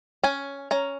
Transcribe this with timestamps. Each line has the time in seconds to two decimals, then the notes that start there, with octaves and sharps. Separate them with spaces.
0.24 C#4 G#5
0.71 C#4 A#5